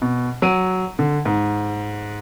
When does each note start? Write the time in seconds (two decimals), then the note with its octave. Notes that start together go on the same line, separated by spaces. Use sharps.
0.02 B2
0.42 F#3 D7 D#7
0.99 D3
1.25 G#2